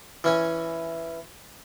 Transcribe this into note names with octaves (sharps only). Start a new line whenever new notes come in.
E3 C#4 G#5